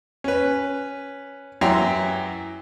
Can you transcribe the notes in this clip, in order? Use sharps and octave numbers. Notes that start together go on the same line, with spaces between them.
C#4 B4
F#2 E3 E4 G5 A#5 C6